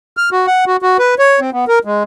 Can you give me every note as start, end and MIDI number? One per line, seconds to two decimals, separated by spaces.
0.17 0.30 89
0.32 0.46 66
0.47 0.65 78
0.67 0.77 66
0.82 0.97 66
0.99 1.15 71
1.19 1.40 73
1.40 1.50 60
1.53 1.65 59
1.68 1.79 70
1.85 2.03 56